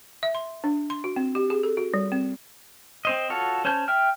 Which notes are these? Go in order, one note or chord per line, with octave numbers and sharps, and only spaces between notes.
E5
C6
D4
C6
F#4
C4
G4
G#4
A4
F#4
G3
C4
C4 C5 D#5
F4 F#4 A4 C#5
C#4 C5 C#5 A5 G6
E5 G5 F6